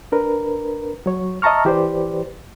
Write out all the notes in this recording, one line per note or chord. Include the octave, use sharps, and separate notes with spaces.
D4 A#4 B4
F#3 C#5
D#5 E5 A5 A#5 C#6 F6
E3 G4 B4 C5 D5